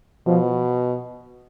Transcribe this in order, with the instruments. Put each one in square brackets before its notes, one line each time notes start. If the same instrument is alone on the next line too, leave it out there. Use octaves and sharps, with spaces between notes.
[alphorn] B2 [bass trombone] F3